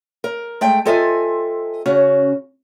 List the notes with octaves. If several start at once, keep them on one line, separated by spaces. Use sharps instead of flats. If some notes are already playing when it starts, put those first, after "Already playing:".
A#4
G#3 A3 G5
C4 F4 A4 D#5 E5 G#5
C#3 C#4 F#4